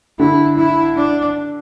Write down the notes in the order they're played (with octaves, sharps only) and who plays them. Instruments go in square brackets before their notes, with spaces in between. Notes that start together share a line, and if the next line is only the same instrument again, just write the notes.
[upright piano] D3 [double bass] E4
[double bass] E4
D4